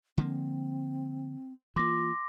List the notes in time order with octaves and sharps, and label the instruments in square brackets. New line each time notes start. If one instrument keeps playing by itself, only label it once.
[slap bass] D3 F3 A#3 [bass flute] C4
[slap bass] E3 A#3 [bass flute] F4 [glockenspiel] C6 D6 A#6